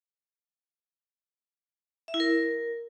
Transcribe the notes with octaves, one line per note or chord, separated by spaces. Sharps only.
E5
E4
A#4